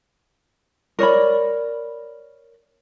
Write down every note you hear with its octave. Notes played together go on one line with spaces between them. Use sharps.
A#4 C#5 D5 B5